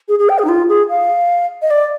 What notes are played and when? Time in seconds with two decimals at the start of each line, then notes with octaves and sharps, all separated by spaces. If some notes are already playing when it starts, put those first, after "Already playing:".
0.08 G#4
0.19 G#4
0.29 G5
0.39 G#4
0.45 D#4
0.49 F4
0.69 G#4
0.89 F5
1.62 D#5
1.71 D5